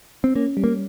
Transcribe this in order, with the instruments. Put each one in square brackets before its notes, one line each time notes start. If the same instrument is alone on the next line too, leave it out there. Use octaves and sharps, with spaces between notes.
[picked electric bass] C4
[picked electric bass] A#3 [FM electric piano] C#4
[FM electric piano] G3
[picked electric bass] A#3